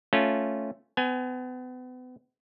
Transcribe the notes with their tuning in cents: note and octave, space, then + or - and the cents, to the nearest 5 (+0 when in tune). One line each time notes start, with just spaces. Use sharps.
A3 +0 C#4 +0 F4 +0
B3 +35 G#5 +10